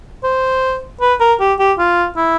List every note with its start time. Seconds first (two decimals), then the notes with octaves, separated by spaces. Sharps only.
0.24 C5
1.01 B4
1.20 A#4
1.40 G4
1.59 G4
1.79 F4
2.16 E4